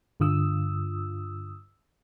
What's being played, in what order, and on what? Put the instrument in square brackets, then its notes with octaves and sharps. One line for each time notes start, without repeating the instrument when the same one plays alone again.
[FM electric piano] G2 D3 F4 D#6 E6